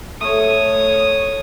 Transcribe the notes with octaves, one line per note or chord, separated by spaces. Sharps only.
A3 A4 C#5 D#6